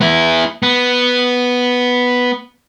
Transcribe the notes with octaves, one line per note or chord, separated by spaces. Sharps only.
B3 E4
B3